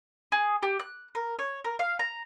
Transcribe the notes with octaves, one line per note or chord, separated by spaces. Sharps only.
G#4
G4
F#6
A#4
C#5
A#4
F5
A#5